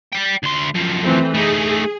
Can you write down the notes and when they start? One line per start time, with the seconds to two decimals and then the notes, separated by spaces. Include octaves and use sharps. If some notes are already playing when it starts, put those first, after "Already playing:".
0.12 D5 G5
0.43 D2 C6
0.74 F#2 F3
1.03 E3 A3 C4
1.34 A3 D#4 G#4